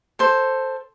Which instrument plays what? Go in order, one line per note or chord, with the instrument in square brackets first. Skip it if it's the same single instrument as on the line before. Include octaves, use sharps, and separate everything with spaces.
[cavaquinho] A4 C5